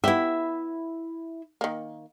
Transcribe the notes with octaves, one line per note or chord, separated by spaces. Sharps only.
B3 E4 G4 E5
D#3 A#3